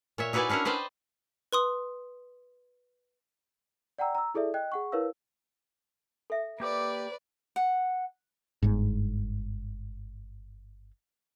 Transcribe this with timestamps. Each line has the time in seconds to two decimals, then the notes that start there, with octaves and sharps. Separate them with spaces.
0.18 A#2 C#5 E5
0.33 D#4 E4 F#4 B4 D5 G#5
0.49 C#4 D4 E4 F#4 A#4
0.65 B4 C5 D5 D#5 G5
1.53 B4 C6 D#6
3.98 D5 F#5 G5 A#5 E6
4.15 A#5 E6
4.35 E4 G#4 A4 D5 E5
4.54 D#5 G5 F#6
4.72 G#4 F#5 C#6
4.92 E4 A#4 B4 C#5 F5 E6
6.30 A4 E5
6.60 A#3 G4 B4 D5 D6
7.56 F#5
8.63 G1 G#2